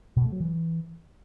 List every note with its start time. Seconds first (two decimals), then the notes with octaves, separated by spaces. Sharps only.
0.17 B2
0.25 A3
0.32 F#3
0.40 E3